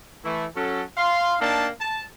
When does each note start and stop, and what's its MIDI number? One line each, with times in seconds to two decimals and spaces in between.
0.24 0.45 52
0.24 0.45 57
0.24 0.45 64
0.55 0.81 54
0.55 0.81 61
0.55 0.81 66
0.55 0.81 69
0.98 1.36 77
0.98 1.36 84
1.41 1.67 58
1.41 1.67 62
1.41 1.67 63
1.41 1.67 79
1.41 1.67 81
1.80 2.03 81